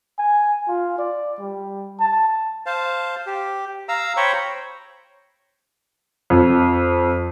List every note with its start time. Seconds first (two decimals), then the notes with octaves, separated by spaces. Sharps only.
0.19 G#5
0.68 F4
0.98 D5
1.40 G3
2.00 A5
2.66 C5 F5 A5
3.26 G4
3.89 F5 A#5 E6
4.17 C5 C#5 G5 A#5 B5 C#6
6.30 F2